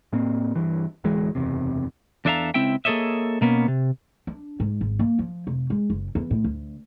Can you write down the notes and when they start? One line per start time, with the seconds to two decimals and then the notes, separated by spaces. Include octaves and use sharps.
0.13 A2 A#3 C4
0.55 G2 E3
1.04 D1 E3 G#3
1.35 F#1 E2 C3
2.25 E2 D4 A4 E5 F5 A#5
2.54 C#2 C4 E4 E5 G5
2.85 A#3 G#4 A4 C#5 D#5 E5
3.41 B2 A#3 B3 C#4
3.68 C3
4.27 D4
4.60 G#2
4.81 G#1
4.99 A#3
5.19 F3
5.47 F1
5.70 G#3
5.90 F#1
6.15 E2
6.31 A2
6.44 D2